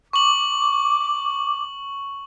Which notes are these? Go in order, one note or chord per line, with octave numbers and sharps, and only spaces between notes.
C#6 D6 F#7